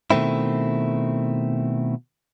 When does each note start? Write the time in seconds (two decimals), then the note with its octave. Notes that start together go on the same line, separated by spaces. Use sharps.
0.11 B2 D#3 A3 C4 E4